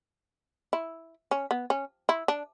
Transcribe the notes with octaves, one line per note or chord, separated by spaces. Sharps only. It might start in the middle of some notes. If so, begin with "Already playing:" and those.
E4
C#4
B3
C#4
E4
D4